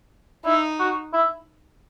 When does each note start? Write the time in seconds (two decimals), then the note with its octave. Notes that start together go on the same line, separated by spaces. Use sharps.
0.45 D#4 E4
0.79 F#4
1.13 E4